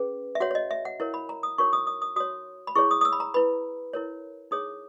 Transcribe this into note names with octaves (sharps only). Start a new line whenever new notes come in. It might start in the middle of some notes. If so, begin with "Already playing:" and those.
Already playing: C#4 G#4 B4
E5
F#4 C#5 F#5
C#5
D#5
E5
F#5
E4 A#4 C#5
B5
A#5
D#6
D#4 F#4 A#4 C#5 C#6
D#6
D#6
D#6
F#4 C#5 D#6
B5
E4 G#4 C#5 C#6
D#6
D#6
E6
B5
A#5
E4 B4 B5
E4 A#4 C#5
D#4 G#4 C#5 D#6